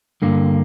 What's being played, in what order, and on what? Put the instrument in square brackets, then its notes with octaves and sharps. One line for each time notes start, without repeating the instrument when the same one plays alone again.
[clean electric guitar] G2 D3 A#3